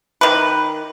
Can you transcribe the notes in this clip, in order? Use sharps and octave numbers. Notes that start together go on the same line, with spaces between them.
D#3 B4